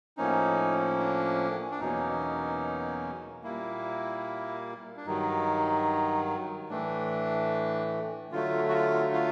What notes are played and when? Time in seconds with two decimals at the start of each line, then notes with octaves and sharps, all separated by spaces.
0.17 A2 F3 A#3 C#4 D#4
0.99 D4
1.71 D4
1.81 E2 B2 F#3 A#3 C#4 D#4
3.44 A#2 G3 A#3 E4
4.97 D4
5.06 G2 D#3 F#3 D#4
6.69 A2 E3 A3 D4
8.32 D3 F#3 A3 F4
8.69 F#4
8.73 F4
9.14 F4